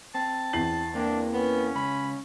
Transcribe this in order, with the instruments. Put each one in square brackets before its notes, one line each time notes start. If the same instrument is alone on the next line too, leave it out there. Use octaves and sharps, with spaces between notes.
[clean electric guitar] C4 [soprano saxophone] A5
[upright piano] E2 C7 F#7
[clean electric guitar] A#3 C4 [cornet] D4
[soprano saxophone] B3 [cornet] C#4
[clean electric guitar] C#2 [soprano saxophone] B5